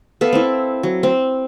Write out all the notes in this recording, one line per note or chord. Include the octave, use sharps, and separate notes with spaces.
B3 A4 E5 F5
C4 E4
F#3
C4